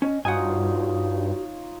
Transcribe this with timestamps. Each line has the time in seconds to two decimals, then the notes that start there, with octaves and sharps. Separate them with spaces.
0.02 C#4 D#5
0.25 G2 D#4 F4 F#4 C#5 F#5 G#5